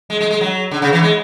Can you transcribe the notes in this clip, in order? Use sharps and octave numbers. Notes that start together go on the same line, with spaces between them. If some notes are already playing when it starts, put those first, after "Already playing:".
G#3
G#3
G#3
F#3
D3
C#3
E3
G#3